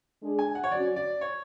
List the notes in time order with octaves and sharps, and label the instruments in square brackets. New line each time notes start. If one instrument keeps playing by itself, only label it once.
[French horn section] G#3 D4 G#4
[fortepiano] G#5
F#5
C#5
[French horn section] F#3 C#4 F#4 [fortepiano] D5
[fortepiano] D5
C#5